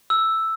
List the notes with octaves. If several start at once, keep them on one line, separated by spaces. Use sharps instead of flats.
E6